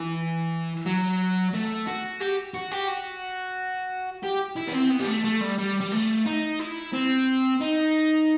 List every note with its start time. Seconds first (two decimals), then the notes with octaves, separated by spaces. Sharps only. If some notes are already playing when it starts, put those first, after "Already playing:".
Already playing: E3
0.86 F#3
1.53 A3
1.87 F#4
2.20 G4
2.54 F#4
2.72 G4
2.88 F#4
4.23 G4
4.57 E4
4.68 B3
4.74 C4
4.91 B3
5.00 G3
5.07 A3
5.25 A3
5.41 G3
5.58 G3
5.80 G3
5.92 A3
6.26 D#4
6.59 E4
6.93 C4
7.61 D#4